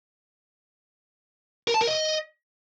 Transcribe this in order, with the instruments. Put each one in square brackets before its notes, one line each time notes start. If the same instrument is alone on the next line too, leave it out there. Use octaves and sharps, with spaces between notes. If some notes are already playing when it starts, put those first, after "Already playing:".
[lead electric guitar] A#4
A5
A#4
D#5